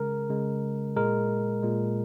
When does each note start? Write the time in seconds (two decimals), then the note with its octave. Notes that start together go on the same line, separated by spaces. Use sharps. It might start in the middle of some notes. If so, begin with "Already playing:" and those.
Already playing: C#3 G#3 A#4
0.30 C#3 G#3
0.96 A#2 G#3 A#4
1.63 A#2 G#3